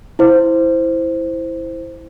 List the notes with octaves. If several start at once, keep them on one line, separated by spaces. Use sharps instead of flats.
E4 C5